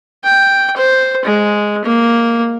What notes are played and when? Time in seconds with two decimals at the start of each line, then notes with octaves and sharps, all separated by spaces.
0.23 G5
0.77 C5
1.24 G#3
1.84 A#3